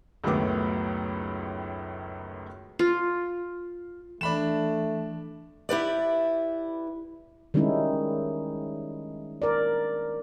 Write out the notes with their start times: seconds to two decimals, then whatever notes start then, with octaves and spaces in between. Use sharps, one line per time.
0.24 C#2 F#2 A2 D#3 B3 D6
2.79 F4
4.21 E3 A3 D4 B5 E7
5.69 E4 G4 B4 D5
7.54 D#3 G3 G#3 C#4 D#4 E4
9.42 A#4 D5